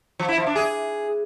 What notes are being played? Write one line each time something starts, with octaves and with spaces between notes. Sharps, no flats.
F3
E4
F3
D4
G#4